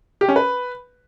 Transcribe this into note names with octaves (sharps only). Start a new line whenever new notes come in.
G4
C#4
B4